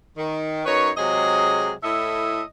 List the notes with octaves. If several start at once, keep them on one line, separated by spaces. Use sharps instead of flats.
D#3
F#2 D#4 B4 C#5
C3 F#3 G#3 G#4 D#5
A2 E4 A4 D#5 E5